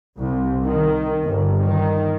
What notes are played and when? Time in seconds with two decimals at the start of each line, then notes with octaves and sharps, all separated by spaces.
0.18 C2
0.64 D#3
1.24 G1
1.60 D#3